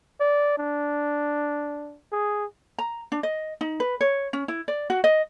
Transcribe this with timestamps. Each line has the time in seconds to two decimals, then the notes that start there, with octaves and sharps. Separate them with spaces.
0.21 D5
0.58 D4
2.12 G#4
2.79 A#5
3.12 D4
3.23 D#5
3.61 D#4
3.80 B4
4.01 C#5
4.33 C#4
4.48 E4
4.68 D5
4.90 F#4
5.04 D#5